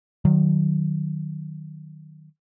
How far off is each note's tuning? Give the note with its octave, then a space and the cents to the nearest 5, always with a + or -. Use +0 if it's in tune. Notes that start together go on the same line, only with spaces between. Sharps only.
D#3 -20 F#3 +0